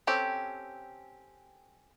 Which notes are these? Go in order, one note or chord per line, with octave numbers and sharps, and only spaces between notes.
C4 C#4 G4 A4